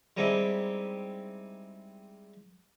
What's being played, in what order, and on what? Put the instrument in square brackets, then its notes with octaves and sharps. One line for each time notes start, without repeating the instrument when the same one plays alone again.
[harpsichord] G3 G#3 C4 D#4 E4 G4